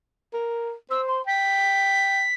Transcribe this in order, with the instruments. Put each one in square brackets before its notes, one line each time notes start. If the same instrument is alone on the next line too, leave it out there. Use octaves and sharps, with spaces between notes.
[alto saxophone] A#4
[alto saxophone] C5 [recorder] E6
[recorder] C6
[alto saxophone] G5 [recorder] B6